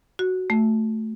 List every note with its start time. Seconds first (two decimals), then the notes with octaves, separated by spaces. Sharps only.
0.19 F#4
0.50 A3